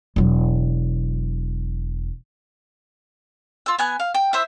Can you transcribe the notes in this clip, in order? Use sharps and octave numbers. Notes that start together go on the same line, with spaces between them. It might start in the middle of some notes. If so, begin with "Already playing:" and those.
E1 F#3
F4 E6
B3 G#5 F#6
F5
G5
E4 C5 E5